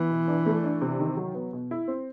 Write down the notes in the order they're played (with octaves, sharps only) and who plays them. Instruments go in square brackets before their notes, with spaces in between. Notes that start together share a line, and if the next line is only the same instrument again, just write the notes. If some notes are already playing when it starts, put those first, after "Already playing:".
Already playing: [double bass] E3 [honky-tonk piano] B3
[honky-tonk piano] B2
D4
A3
D4
C3
D#3
F#3
B3
B2
E4
C4